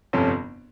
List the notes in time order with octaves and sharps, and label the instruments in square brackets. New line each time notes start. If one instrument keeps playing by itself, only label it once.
[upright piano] G1 F2 C3 F3 A3 C#4